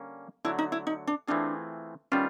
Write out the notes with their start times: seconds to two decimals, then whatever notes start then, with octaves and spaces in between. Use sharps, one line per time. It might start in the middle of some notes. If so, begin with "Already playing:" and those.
Already playing: D3 G3 A#3 C#4
0.45 D3 F#3 A3 E4
0.59 D#4
0.72 E4
0.87 D#4
1.07 D4
1.28 E3 A3 C4 D4 F4 G#4
2.12 D#3 G3 B3 C#4 D4 F4